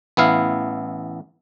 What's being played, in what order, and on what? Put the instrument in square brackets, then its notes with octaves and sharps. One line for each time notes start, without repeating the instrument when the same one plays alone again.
[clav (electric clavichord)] A1 B3 E4 F5